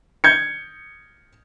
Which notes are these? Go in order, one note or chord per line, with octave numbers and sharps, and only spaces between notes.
G6 G#6 C#7